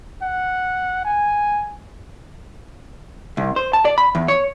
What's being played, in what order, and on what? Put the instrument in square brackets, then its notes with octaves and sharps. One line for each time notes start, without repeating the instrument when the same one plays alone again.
[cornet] F#5
G#5
[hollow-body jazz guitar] C2
C5
A5
D5
B5
E2
C#5